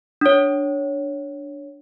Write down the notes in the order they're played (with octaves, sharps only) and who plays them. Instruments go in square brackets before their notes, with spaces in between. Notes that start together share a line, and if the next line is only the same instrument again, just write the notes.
[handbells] D4 C#5